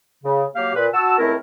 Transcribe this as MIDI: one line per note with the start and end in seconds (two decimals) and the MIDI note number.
0.24 0.45 49
0.55 0.72 54
0.55 0.72 58
0.55 0.72 67
0.55 0.72 77
0.75 0.87 46
0.75 0.87 71
0.94 1.16 66
0.94 1.16 81
0.94 1.16 88
1.18 1.35 37
1.18 1.35 57
1.18 1.35 60
1.18 1.35 64
1.18 1.35 70